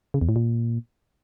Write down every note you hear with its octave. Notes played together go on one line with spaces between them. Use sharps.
C#3
E2
A2
A#2